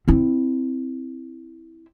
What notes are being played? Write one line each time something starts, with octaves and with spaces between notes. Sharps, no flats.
C4 E4